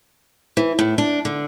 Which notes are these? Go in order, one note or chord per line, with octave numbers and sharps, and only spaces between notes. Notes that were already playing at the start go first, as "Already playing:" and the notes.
E3
A2
D4
D3